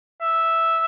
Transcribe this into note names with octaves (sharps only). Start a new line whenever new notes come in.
E5